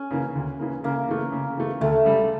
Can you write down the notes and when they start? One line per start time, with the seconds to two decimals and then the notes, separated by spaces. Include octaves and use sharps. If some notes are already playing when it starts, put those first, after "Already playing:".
Already playing: C#4
0.11 C#3 E3 A#3
0.35 D2
0.59 C#3 E3 A#3
0.84 C#3 A#3
1.09 E3 A3
1.32 C#3
1.57 E3 A3
1.81 D2 A3
2.05 C#3 G3